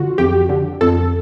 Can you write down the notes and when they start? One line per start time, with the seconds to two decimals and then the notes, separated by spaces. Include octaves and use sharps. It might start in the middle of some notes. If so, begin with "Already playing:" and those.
Already playing: D3 F4 F#4
0.18 F2 G4
0.49 D3
0.81 F2 A4